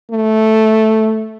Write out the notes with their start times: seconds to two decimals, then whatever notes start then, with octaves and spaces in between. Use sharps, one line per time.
0.11 A3